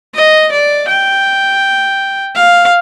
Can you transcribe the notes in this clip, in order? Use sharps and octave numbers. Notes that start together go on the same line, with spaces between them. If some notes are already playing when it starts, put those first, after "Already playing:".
D#5
D5
G5
F5